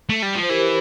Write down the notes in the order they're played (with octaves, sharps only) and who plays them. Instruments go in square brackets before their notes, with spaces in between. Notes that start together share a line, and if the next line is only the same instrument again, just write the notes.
[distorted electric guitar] A3
G3
F3
[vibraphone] C5
[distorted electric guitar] E3 [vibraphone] G4 A#4